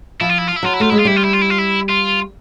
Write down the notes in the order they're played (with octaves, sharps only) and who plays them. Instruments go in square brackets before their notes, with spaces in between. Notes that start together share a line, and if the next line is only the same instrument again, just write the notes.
[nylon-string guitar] F3 [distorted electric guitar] E4
[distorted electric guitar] F4
E4
F4
E4
[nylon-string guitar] F#3 [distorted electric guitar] F4
[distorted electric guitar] E4
[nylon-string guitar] A3 [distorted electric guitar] F4
[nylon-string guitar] G#3 [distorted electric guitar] E4
[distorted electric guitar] F4
[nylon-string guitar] G3 [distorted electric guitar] E4
[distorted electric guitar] F4
E4
F4
E4
F4
E4
F4